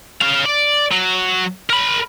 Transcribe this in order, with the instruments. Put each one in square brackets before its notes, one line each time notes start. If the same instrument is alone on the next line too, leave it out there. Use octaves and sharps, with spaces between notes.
[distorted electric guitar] C#4 F5
D5
F#3
A#4 B5